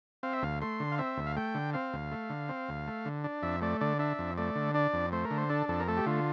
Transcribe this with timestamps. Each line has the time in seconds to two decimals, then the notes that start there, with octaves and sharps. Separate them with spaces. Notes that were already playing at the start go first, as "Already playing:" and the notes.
0.23 C4 F5
0.33 E5
0.42 D2 F5
0.61 A3 C6
0.80 D3
0.92 F5
0.98 C4 E5
1.17 D2
1.27 F5
1.37 A3 G5
1.55 D3
1.73 C4 F5
1.93 D2
2.11 A3
2.30 D3
2.49 C4
2.69 D2
2.87 A3
3.05 D3
3.24 D4
3.43 F2 E5
3.61 A3 D5
3.81 D3 D5
3.99 D4 E5
4.19 F2
4.37 A3 D5
4.55 D3
4.74 D4 D5
4.93 F2
5.12 A3 C5
5.25 A#4
5.31 D3
5.38 C5
5.49 D4 A4
5.68 F2 A4
5.80 A#4
5.88 A3 A4
5.97 G4
6.06 D3 F4